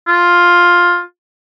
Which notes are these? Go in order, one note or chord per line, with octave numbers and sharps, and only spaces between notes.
F4